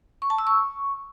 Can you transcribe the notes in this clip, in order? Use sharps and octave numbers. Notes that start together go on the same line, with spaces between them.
C#6
A5
E6
C#6